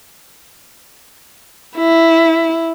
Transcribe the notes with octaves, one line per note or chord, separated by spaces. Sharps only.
E4